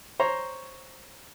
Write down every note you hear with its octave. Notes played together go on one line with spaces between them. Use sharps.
C5 C#5 A#5